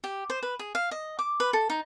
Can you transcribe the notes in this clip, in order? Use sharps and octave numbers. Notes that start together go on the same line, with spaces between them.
G4
C5
B4
G#4
F5
D#5
D6
B4
A4
D#4